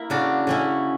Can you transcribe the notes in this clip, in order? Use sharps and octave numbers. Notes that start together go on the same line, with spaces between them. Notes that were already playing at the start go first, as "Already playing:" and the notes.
Already playing: A#3 E4
C#3 D4 F#4
C#3 C#4 E4